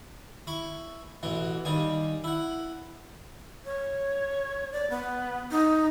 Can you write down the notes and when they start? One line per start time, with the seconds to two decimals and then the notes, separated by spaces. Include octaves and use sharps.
0.47 E4 C#6
1.23 A1 B2 E3
1.65 D#2 G3 G#5
2.24 E4 F#5
3.65 C#5
4.72 D5
4.90 B3
5.51 D#4